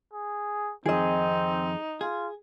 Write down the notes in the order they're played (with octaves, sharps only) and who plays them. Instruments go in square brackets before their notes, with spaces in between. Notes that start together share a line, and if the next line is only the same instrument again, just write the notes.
[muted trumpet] G#4
[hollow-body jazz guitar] F2 D#3 [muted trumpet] C4 [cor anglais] D#4 [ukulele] G#4 D#5
[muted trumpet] F4 [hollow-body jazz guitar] G#4